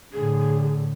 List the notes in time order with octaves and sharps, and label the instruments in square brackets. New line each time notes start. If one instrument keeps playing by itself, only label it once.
[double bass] A2 D3 [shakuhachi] G#4